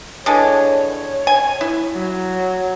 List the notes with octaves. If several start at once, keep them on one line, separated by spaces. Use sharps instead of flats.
D3 E3 G#3 C#5
C#5
G#5
E4
F#3